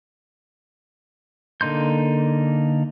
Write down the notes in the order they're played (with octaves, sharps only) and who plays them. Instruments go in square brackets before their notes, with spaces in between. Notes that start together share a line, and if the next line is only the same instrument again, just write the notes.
[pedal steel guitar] D3 A#3 D#4 C6 G6